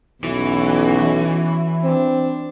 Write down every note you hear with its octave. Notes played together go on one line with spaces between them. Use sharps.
B1 E2 E3 C#4 F#4
C4 D4